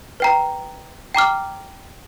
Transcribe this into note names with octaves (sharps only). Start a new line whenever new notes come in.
B4 G5 A#5
G5 A#5 D6 F6